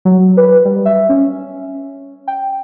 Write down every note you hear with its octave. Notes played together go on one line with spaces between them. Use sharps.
F#3
B4
G3
E5
C#4
G5